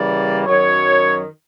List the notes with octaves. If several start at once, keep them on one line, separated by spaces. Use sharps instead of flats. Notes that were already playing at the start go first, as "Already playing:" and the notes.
Already playing: C#3 E3 G3 A#3 D5
F#2 D#3 F#3 C#5